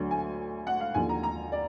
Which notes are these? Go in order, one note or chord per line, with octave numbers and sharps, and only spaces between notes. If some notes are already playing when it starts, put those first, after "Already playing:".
Already playing: D2 D3 F#3
G#5
F#5
F5
D#2 D3 F3 G#5
A#5
A#5
D5